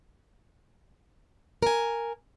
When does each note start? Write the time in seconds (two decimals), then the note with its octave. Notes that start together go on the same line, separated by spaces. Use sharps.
1.62 A#4 G#5